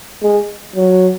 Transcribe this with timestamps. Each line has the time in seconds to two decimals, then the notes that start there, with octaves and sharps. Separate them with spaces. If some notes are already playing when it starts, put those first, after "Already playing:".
0.23 G#3
0.76 F#3